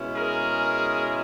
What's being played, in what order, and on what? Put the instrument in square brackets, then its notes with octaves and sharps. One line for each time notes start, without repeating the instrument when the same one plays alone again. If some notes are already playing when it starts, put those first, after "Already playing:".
Already playing: [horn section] B2 G#3 C#4 E4
G#4 A#4